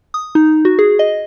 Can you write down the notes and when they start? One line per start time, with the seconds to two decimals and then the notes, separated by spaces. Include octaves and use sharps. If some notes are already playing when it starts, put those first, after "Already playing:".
0.14 D#6
0.35 D#4
0.65 F#4
0.79 G#4
0.99 D#5